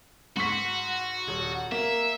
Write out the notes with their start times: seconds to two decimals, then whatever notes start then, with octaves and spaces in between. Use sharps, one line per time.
0.37 G#2 F#4 C#6 B6
1.28 D#1
1.72 A#3 E5